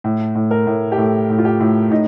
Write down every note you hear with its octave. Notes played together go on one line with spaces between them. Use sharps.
A2
A2
A#4
A2
G4
A2 A4
A2
F4
G4
A2
A2 D#4